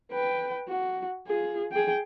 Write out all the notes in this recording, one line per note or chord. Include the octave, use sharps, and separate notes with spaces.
B4 G5
F#4
F4 G#4
G#4 G5